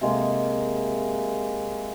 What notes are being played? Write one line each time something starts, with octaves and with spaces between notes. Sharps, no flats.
C3 G#3 A#3